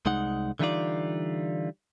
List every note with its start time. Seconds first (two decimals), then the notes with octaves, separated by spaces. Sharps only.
0.06 C2 G#3 D#4 F#5
0.59 D3 E3 G3 D#4 F4 D5